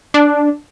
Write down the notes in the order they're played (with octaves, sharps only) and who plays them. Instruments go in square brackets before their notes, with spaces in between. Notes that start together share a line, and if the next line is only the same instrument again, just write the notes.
[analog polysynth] D4